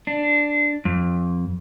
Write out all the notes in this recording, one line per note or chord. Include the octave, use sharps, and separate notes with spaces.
D4
F2